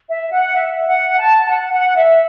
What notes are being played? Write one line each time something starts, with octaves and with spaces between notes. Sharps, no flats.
E5
F#5
E5
F#5
A5
F#5
F#5
E5